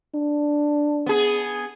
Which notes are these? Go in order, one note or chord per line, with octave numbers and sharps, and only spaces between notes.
D4
B3 G#4